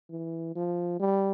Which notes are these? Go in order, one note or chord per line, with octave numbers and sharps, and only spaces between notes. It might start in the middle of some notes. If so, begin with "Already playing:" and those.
E3
F3
G3